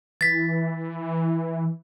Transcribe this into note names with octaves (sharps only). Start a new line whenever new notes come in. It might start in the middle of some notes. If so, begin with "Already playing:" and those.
E3 A6 B6